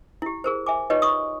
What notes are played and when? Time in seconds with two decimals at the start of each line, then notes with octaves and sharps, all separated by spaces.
0.22 E4 G4
0.44 G#4 A#4 C5
0.66 E5 G#5 D6
0.90 D#4 F4 G4 B4 C#5 D#5
1.02 C#6 D#6